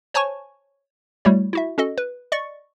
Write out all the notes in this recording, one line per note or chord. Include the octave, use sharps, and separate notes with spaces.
C5 C#5 G#5 A5 C#6
G3 A3 E4 F#4 C#5
E4 F#4 E5
C#4 F#4 A4 D#5
B4
D5 D#5 C#6 A6 C#7